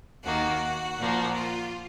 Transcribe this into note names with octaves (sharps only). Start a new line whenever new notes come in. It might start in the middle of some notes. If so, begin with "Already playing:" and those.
D#2 D#3 A#3 F#4
A#2 F3 A#3
F4